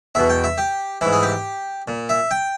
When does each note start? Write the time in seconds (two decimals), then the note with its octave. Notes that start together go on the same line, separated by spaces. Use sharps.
0.15 E2 B2 E5
0.30 G5
0.44 E5
0.58 G4
1.01 G#2 E3 E4
1.12 G#4
1.23 G4
1.88 A#2
2.09 E5
2.31 G5